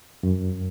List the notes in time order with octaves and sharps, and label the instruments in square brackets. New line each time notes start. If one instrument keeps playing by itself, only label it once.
[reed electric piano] F#2